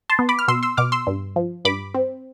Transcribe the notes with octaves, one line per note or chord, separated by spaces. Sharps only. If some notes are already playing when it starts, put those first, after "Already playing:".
A5 C6
B3
B5 D6
F6
B2 C6 E6
C6 E6
B2 D6 F6
C6 E6
G2
F3
G2 B5 D6
C4